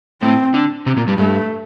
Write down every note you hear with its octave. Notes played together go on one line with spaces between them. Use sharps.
A2 A3 C4
D3 D4
C3 C4
A#2 A#3
G2 G3
G2 G3 A3